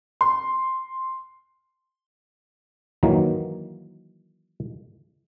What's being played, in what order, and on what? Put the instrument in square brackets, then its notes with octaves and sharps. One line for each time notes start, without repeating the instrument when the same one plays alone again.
[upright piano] C6
[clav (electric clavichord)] D#3 E3 F#3 A#3